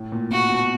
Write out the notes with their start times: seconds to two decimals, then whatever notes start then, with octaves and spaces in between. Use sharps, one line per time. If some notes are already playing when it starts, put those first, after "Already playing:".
Already playing: A2
0.12 A#2
0.31 B2 F#4
0.51 B2